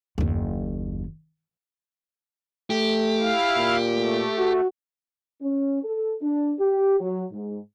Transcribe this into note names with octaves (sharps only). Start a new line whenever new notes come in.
F#1 D#2
A3 G4
E4 F5
A#2
A3
F#4
C#4
A4
D4
G4
F#3
G#2